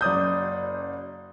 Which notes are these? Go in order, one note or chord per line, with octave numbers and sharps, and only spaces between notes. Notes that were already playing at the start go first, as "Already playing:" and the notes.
F#1 D5 D#6 G6